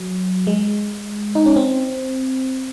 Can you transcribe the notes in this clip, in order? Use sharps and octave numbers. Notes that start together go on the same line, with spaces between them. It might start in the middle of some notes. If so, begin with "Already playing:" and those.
Already playing: F#3
G#3
D#4
C#4
C4